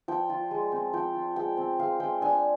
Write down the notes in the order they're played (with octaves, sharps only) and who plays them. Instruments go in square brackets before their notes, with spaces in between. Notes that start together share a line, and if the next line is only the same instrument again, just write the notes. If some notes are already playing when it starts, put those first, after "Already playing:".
[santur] F3 G5
F4
G#3
C4
F3 G5
F4
G#3 G5
C4
G#3 F5
G#3 G5
D4 G#5